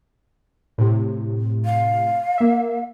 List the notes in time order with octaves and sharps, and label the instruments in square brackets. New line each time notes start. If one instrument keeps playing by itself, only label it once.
[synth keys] A2 C3
[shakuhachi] F5
[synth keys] A#3 E5